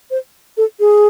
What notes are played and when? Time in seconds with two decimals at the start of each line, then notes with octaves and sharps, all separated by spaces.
0.11 C5
0.57 A4
0.80 G#4